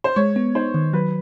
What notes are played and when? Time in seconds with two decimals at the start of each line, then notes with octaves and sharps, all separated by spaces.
0.04 C5
0.16 G#3 C#5
0.36 B3
0.55 D#4 C5
0.74 D#3
0.93 F#3 B4